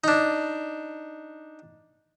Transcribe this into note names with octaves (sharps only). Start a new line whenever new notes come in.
D4 D#4